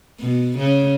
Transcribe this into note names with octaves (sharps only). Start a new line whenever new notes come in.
B2
C#3